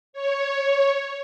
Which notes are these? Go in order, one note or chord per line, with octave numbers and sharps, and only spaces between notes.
C#5